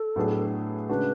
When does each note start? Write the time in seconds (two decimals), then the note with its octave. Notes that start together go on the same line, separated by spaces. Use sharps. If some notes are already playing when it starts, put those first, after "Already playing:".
Already playing: A4
0.16 A2 F#3 B3 D4 G#4
0.89 C#3 G#3 D4 F#4 B4